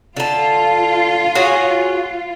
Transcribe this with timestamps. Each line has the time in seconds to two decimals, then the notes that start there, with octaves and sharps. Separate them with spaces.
0.17 D3 F4 A5
1.35 F#4 G#4 C#5